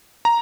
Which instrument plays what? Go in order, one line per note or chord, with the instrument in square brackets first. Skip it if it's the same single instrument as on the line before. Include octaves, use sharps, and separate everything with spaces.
[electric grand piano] A#5